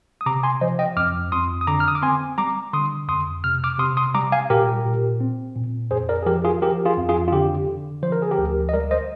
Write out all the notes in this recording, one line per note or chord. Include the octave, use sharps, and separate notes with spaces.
D#6
C3 A#5 D6
G#5 C6
F3 C5 D#5
D#5 G5
F2 D6 F6
F2 C6 D#6
D#6
D3 A#5 D6
F6
D#6
D6
C4 G#5 C6
G3 A#5 D6
D3 C6 D#6
F2 C6 D#6
C3 F6
D6 F6
C3 C6 D#6
C6 D#6
G3 A#5 D6
F5 G#5
A#2 G4 A#4
A#2
C4
A#2
F2 G#4 C5
A#4 D5
G#4
F3 G4 A#4
F4 G#4
F3 G4 A#4
F4 G#4
F2
F4 G#4
F4
D3 G4
D3
F3 C5
A#4
G#4
G4 A#4
D2
D#5
G3 A#4 D5
C5 D#5